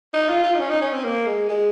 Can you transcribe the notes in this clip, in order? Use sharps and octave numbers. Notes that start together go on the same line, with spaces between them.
D#4
F4
F4
D#4
C#4
D#4
C#4
C4
A#3
G#3
G#3